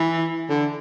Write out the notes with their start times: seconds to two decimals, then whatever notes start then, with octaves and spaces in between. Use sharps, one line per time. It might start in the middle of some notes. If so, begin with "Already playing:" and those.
Already playing: E3
0.49 D3